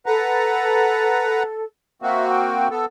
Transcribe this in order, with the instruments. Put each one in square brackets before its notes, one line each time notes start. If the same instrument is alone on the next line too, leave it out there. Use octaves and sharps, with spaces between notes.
[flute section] A4 [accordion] B4 F#5 A#5
[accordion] A#3 C4 F#4 [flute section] E5
[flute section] G5
[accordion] B3 A4